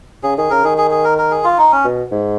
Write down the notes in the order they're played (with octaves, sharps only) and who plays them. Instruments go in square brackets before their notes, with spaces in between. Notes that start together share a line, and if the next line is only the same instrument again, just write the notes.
[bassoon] C#3 [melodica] G#4
[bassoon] D#3 [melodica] G#4
[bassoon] C#3 [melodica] A#4
[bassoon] D#3 [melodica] G#4
[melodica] G#4
G#4
A#4
A#4
G#4
F4
D#4
C#4
[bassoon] B2
G#2